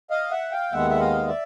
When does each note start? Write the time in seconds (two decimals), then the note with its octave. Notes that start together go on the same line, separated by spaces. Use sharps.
0.10 D#5 F5
0.31 E5 F#5
0.52 F5 G5
0.72 D#2 D#3 G#3 B3 E5 F#5
0.90 E5
1.00 D#5 F5
1.28 D5 E5